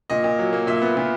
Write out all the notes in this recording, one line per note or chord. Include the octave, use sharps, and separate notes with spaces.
A#2 D#5
A#2
F#3
A#3
A#2 E5
B3
A#2